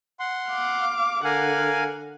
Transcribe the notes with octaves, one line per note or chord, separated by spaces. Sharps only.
F#5 C6
F5 D6
D3 A#4 F5 F#5 G#5